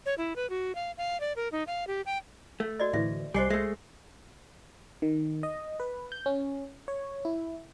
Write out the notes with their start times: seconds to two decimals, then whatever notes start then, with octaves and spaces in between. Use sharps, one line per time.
0.06 C#5
0.18 E4
0.36 B4
0.50 F#4
0.75 F5
0.97 F5
1.20 D5
1.36 A#4
1.52 D#4
1.67 F5
1.87 G4
2.06 G5
2.60 A3
2.80 F#4 D5 D#5
2.93 D2 A2 E3 E5
3.34 C2 G3 C5 D#5 G#5 C6
3.50 G#3 A3 E5
5.02 D#3
5.43 D#5
5.80 B4
6.12 G6
6.26 C#4
6.88 C#5
7.25 E4